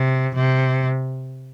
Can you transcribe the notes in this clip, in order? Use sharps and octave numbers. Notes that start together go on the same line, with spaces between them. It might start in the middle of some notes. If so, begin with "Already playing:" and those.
Already playing: C3
C3